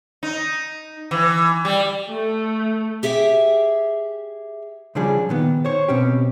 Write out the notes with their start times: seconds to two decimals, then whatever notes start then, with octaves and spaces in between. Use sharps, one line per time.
0.23 D#4
1.11 E3
1.65 G3
2.10 A3
3.03 G4 G#4 E5 F5 G5
4.95 C#3 F3 G3 D4 G#4
5.29 A#2 D#3 B3
5.65 C5 C#5
5.88 B2 C4 C#4 G4